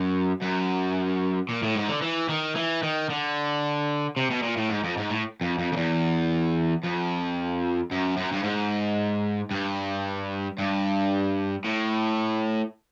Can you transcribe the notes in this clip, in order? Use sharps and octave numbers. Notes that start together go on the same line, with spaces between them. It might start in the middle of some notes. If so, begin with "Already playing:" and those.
Already playing: F#2
F#2
A#2
A2
G#2
D3
E3
D#3
E3
D#3
D3
C3
B2
A#2
A2
G#2
F2
G#2
A2
F2
F2
F2
E2
F2
F#2
F#2
G2
G#2
G2
G2
A2